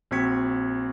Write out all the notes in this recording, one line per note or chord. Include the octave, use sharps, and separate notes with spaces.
A#1 C4 F#4 G#6 B6 C#7